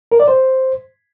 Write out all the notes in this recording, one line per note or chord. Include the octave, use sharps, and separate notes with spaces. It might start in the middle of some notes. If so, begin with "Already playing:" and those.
A#4
D5
C5